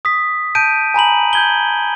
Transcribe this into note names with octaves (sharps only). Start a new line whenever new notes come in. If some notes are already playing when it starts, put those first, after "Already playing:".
D#6 B6
A5 G6 D7 D#7
G#5 A#5 B5 F#7
G6 G#6 G7